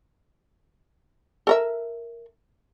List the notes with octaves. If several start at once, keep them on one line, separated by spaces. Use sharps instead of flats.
A4 A#4 E5